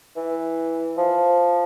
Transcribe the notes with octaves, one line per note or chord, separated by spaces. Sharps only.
E3
F3